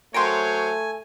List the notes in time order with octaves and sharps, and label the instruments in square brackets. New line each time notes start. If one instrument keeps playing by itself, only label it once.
[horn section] F#3 C5 C#5 [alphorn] A3 [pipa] A#4 G5 C6 [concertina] G#5